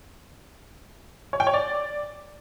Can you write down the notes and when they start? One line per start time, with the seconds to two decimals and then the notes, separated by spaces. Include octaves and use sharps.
1.33 C#5
1.40 G5
1.47 C#5
1.54 D5